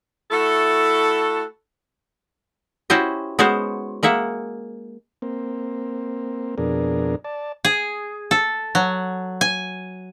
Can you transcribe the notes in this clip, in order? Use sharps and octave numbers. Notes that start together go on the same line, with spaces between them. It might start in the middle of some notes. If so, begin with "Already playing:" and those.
A3 E4 F#4 A4
C#4 E4 F#4 G4 C5 D#5
G#3 B3 C#4 F#4 C5
G#3 A#3 E5 F#5
A#3 C4
F2 B2 D4 G#4 A#4
D5 A5
G#4
A4
F#3
G#5